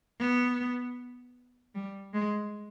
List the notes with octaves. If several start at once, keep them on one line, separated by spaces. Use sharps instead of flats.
B3
G3
G#3